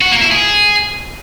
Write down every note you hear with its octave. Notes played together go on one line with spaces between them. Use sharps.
F#4
A#3
E4
G#4